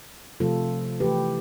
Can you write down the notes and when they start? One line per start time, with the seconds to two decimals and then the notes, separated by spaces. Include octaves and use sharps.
0.40 C3 F3 A3 F4 A4
1.00 E3 A3 G4 B4